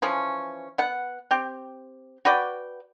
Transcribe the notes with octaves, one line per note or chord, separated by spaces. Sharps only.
E3 F3 C#4
B3 F#5
C4 G4
F#4 B4 D5 G5